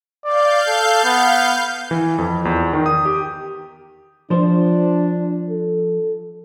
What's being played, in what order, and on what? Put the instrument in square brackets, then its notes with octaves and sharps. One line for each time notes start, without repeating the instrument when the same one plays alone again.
[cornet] D5 [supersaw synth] F5 G6
[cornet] A4
B3
[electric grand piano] E3
F2
E2
D#3
D#6
G4
[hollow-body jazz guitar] F3 C5 [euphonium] D4
[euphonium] A4